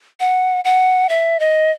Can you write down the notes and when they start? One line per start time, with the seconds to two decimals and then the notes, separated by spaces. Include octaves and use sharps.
0.20 F#5
0.65 F#5
1.09 E5
1.40 D#5